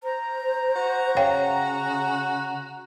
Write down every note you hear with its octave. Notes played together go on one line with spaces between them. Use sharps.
C5 A#5
F#4
C#3 C#5 F5 G5